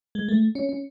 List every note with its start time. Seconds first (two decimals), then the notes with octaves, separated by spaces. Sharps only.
0.15 G#3
0.28 A3
0.55 C#4
0.69 C#4